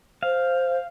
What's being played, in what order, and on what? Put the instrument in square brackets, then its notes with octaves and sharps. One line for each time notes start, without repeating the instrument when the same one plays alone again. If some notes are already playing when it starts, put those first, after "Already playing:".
[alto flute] C5 [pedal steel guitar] F5